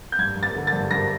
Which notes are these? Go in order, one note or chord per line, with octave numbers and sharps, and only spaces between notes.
G6
G2 G#6
G2
A6
D3
A6
G2
G2 A#6